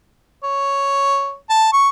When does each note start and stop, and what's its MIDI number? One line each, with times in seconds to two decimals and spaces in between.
0.43 1.35 73
1.50 1.72 81
1.73 1.89 85